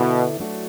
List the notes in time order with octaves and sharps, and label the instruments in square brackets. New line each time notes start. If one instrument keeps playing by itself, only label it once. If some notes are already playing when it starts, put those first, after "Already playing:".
Already playing: [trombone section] B2 [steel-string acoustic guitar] D3 B3 E4 D5
[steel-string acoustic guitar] F#3 A3 D4 F#4